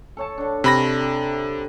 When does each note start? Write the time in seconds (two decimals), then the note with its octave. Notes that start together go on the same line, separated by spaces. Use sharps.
0.17 A4 C#5 A5
0.38 D3 D4
0.64 C3 B5 A#6